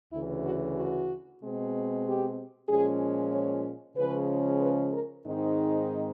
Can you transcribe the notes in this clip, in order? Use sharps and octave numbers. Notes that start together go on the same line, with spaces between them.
D2 C#3 E3 E4
F#4
F#4
B2 G#3 C4
G4
A#2 F3 G#3 C#4 G#4
C#5
C#3 F3 G#3 C#4 B4
B4
A#4
G#2 D#3 G#3 C4 D#4